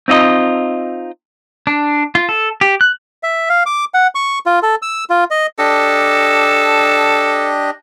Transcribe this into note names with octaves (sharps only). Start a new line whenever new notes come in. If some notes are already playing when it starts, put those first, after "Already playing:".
C4 D#4 F4 D#5
D4
F4
A4
G4
F#6
E5
F5
D6
F#5
C#6
F4
A4
E6
F4
D#5
D4 G4 A4 D#5